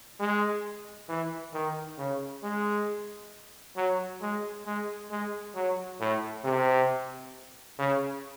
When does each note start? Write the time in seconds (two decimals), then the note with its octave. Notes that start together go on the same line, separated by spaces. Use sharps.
0.20 G#3
1.09 E3
1.54 D#3
1.98 C#3
2.43 G#3
3.76 F#3
4.21 G#3
4.66 G#3
5.11 G#3
5.55 F#3
6.01 A2
6.44 C3
7.79 C#3